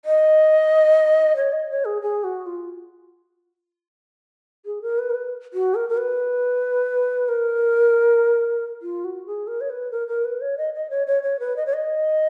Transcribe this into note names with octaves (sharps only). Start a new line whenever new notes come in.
D#5
C#5
D#5
C#5
G#4
G#4
F#4
F4
G#4
A#4
B4
A#4
B4
F#4
A#4
A#4
B4
A#4
F4
F#4
G#4
A#4
C#5
B4
A#4
A#4
B4
C#5
D#5
D#5
C#5
C#5
C#5
B4
D#5
C#5
D#5